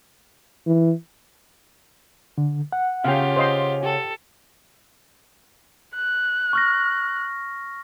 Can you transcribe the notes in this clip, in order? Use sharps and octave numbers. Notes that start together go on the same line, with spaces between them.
E3
D3
F#5
C#3 C#4 F4 G4 F5 G5
C5 D#5 C6
G4 A4
F#6
C#6 F6 A#6